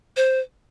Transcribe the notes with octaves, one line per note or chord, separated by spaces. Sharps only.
C5